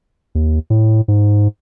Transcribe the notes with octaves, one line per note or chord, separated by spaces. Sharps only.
D#2
A2
G#2